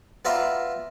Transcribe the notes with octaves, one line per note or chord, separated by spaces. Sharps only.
B3 F4 D5 E5 A#5